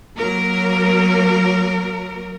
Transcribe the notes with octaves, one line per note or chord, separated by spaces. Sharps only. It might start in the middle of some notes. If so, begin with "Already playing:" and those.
F#3 A#3 A#4